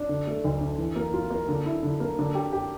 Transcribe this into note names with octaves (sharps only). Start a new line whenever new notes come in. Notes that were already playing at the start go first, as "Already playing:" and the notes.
Already playing: D4
D3
A3
D2
D3
E3
A#3
F4
A#3
D3
E4
D3
A#3
D3
G4
G4